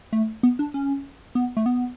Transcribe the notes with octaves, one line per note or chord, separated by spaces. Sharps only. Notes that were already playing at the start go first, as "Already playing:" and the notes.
A3
B3
D4
C#4
B3
A3
B3